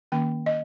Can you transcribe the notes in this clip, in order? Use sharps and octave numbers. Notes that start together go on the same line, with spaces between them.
D#3 A#3 C#4 G5
D#5